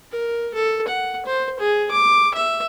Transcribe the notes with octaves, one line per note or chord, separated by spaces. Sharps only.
A#4
A4
F#5
C5
G#4
D6
E5